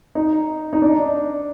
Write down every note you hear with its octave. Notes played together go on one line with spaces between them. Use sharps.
D#4
D#4
D4